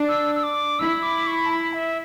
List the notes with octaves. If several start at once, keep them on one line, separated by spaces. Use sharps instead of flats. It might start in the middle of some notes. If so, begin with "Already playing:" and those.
Already playing: D4
E6
E6
D6
E4 E6
D6
C#6
A5
B5
E5